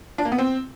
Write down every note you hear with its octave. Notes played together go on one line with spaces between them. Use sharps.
D4
A#3
B3
C4